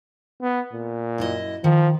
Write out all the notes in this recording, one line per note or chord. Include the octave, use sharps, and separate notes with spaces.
B3
A#2
F#2 E4 D#5
D#3 F3